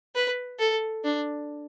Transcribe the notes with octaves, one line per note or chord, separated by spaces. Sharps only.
B4
A4
D4